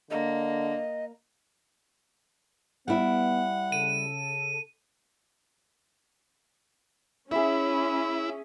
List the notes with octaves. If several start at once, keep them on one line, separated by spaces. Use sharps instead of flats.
D3 A#3 D#5
G3 B3 E4 F#5
C#3 A4 D#7
C#4 E4 G#4 E5 B5